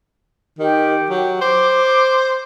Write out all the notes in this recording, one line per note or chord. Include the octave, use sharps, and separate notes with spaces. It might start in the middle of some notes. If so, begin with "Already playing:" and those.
D#3 G4
F#3
C5 D6